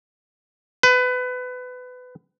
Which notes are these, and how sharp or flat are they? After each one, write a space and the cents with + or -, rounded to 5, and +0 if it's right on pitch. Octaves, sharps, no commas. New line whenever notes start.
B4 +25